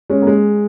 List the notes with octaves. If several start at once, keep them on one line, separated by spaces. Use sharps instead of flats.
G#3 C#4
A#3
G#3